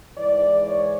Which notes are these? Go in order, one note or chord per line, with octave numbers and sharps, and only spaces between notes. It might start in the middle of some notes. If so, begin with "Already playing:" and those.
G#2 E3 D5
C#5